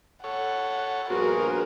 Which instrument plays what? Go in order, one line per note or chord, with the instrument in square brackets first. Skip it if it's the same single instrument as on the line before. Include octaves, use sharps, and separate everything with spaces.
[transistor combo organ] A4 C#5 [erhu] F#5
[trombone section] A#1 G2 G#4 [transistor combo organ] B3 C5 [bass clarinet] F#4 [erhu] A#4